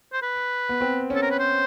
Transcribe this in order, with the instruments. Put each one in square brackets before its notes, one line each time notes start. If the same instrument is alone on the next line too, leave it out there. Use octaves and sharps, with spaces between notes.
[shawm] C5
B4
[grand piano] B3
C4
C#4
[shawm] A4
A#4
B4
C5